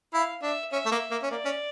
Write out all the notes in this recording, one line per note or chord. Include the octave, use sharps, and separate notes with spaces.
E4 F5
D4 E5
C#4 E5
A3
A#3
A#3
C#4
A#3 D5
C#4